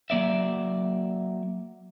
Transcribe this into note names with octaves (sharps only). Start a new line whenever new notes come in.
F#3 A#3 D5 E5